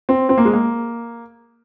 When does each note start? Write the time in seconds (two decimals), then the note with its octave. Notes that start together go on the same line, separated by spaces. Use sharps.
0.09 C4
0.29 C4
0.38 A#3
0.45 G#3
0.53 A#3